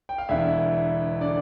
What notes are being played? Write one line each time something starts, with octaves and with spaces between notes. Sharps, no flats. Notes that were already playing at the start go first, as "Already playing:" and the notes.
G5
F5
E1 E2 D3 E4 E5
D3 D4 D5